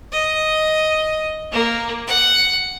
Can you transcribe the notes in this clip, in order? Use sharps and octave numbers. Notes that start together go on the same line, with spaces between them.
D#5
A#3
F#5